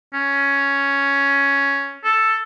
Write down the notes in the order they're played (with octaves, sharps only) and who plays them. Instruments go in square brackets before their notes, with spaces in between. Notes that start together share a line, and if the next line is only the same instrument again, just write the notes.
[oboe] C#4
A4